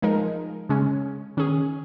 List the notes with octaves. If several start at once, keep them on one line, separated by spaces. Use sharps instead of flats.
F3 G#3 D#4 A#4
C#3 G#3 C#4
D#3 C#4 G#4